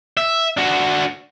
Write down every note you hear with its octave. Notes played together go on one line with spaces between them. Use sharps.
E5
D4 F#4